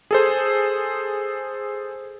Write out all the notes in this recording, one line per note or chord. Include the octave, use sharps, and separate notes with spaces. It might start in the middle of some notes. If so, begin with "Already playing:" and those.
G#4 A4 C5